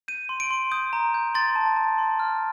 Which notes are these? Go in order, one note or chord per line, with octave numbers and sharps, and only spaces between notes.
G6 D#7
C6
D7
C6
D#6 G6
A#5
G6
C6 A6
A5
A5
C6
F6